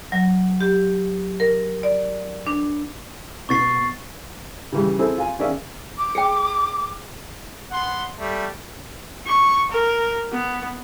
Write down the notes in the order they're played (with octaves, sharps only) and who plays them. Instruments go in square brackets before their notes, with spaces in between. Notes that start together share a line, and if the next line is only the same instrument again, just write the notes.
[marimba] F#3
G4
A#4
D5
D4
[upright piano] B2 B3 [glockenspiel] C#6 A6 C7
[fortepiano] C#3 E3 G3
C4 E4 G#4 A4 C5
F4 G#5
D#3 C#4 G#4 D5 E5 F5
[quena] D6
[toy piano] G#4 G5
[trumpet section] B3 F#5 C6
G3 A3
[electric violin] C#6
A#4
B3